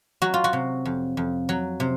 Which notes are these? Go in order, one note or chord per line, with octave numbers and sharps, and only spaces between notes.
F#3 F#4
F4
F#4
C3
F2
F2
F#3
C3